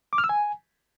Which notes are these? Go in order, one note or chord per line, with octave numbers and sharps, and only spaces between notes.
D6
F6
E6
G#5